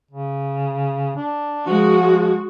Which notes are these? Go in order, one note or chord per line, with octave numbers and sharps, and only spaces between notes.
C#3
D4
F3 G#3 F#4